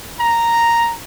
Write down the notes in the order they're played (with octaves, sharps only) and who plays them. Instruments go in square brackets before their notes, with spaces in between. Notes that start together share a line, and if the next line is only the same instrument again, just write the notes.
[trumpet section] A#5